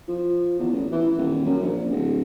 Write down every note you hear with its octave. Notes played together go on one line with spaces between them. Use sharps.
F3
E2
A1
E3
D#1
F#2
A#1
D1